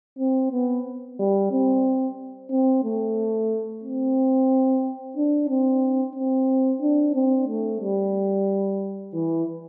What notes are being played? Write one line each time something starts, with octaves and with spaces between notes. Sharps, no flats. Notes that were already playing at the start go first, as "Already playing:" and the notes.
C4
B3
G3
C4
C4
A3
C4
D4
C4
C4
D4
C4
A3
G3
E3